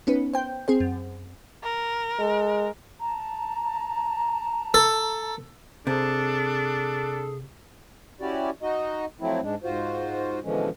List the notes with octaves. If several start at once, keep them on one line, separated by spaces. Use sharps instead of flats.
B3 C#4 D#4 B4
C5 G5 G6
C4 G#4 C5
F#2
A#4
G#3
A5 A#5
A4
C3 D4 G#4 A4
C#4 E4 F#4 G4 D5
D#4 F#4 D#5
F3 F#3 A3 C4 E4
G#2 G#3 D4
G#2 F4 F#4 C5
B2 D3 E3 F3 G#3 C#4